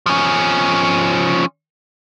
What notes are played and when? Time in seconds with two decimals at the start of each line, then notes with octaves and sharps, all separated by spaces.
0.06 F3 C#4